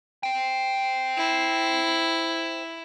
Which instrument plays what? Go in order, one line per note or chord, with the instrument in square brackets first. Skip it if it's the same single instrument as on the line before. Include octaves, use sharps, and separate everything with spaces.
[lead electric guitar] C5 G5
[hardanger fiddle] E4